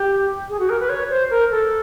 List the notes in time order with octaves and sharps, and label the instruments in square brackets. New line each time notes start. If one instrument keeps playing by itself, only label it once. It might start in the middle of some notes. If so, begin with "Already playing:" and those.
Already playing: [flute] G4
G#4
F#4
A#4
B4
C#5
C5
A#4
A4